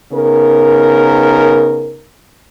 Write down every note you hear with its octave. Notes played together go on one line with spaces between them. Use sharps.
C#3 B3 D#4 A#4